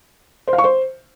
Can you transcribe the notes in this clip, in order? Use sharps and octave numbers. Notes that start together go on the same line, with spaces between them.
C5
F5
C#6
C5